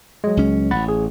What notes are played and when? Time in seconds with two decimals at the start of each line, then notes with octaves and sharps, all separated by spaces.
0.24 F#3 G#3
0.37 C#2 C#4
0.71 A1 F#5 B5 A6
0.89 G#4